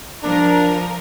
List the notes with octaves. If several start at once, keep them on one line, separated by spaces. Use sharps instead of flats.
F3 D4 A#4